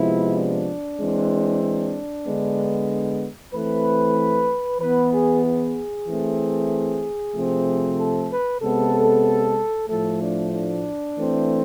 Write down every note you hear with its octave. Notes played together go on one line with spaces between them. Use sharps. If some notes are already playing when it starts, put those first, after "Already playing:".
Already playing: C3 F3 G#3 B3 E4
D4
E3 G#3 C4
D4
D3 G#3 B3
E3 A3 C4 B4
E3 B3 B4
G#4
G#4
E3 A3 C4
C3 F3 A3 C4
A4
B4
C3 G#3 B3 A4
A2 F3 A3 A4
D4
D4
E3 A3 C4